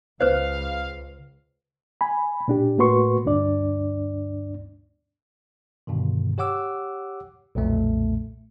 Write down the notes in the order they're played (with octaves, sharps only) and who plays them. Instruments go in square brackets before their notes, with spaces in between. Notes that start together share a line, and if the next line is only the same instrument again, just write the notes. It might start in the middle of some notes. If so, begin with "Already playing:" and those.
[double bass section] C#2 [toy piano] B4 C5 [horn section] F5
[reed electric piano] G#5 B5
A#2 D4 G4
A2 A#3 F#4 B4 C6 C#6
D2 G2 D4 D5
[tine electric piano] G2 B2 D3 D#3
G4 C#5 F#5 D6 E6
B1 F2 A#2 A3